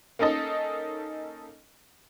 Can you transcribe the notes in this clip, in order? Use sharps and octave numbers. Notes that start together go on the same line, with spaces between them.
A#3 C#4 D#4 A4 D#5